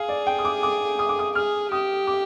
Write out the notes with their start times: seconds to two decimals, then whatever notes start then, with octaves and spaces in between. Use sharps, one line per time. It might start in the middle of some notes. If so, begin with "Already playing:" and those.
Already playing: G#4 F5
0.09 D5
0.27 G5
0.39 D#6
0.45 D6
0.63 D6
0.99 D#6
1.09 D6
1.19 D#6
1.35 G#4 F6
1.71 G4 D#6
2.07 D6